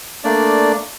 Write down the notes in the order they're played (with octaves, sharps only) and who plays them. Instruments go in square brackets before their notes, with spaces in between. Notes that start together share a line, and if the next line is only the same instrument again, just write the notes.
[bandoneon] A3 A#3 D4 D5